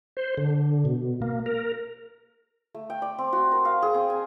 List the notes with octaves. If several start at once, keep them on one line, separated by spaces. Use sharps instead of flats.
C5
D3
B2
A#3
A#4
A3
G5
D5
C4
F#4
A#4
F5
G#4
C4
G#5